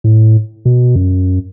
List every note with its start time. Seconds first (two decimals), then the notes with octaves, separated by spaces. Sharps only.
0.04 A2
0.65 B2
0.96 F#2